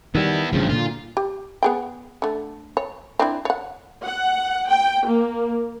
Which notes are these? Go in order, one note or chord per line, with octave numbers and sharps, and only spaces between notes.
D#3 G3 B3 E4
A1 G2 C#3 F3
A#2 D3 F4
G4
B3 G#4 G5
D3 A3
C#5
C4 D4 E4
C#5 F#5
F#5
G5
A#3